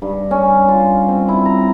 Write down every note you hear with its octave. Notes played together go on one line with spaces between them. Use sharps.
G2
C#4
F4
C4
E4
A#5